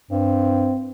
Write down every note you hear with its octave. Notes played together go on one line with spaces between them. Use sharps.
G2 C4